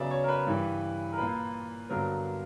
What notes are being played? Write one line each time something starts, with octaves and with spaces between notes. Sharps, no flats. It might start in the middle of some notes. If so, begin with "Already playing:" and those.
Already playing: C#3 F#3 B3 D5 E5
C#5
A#4
B4
G2 E3 G3
A#4
A#2 A#3 B4
G2 D3 F#3 B3 A#4